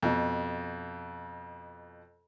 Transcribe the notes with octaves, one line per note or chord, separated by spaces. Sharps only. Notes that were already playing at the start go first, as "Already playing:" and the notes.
F2 B2